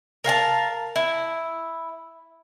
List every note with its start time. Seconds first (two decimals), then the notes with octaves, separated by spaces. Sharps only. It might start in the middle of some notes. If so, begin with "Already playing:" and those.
0.24 A#4 F5 G#5 A5
0.96 E4